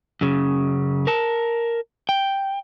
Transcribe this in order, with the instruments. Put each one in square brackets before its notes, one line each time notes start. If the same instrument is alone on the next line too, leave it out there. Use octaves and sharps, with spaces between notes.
[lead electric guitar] F#2 C#3
A#4 A5
G5